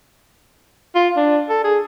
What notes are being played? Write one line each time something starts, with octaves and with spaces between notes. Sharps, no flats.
F4
D4
A4
G#4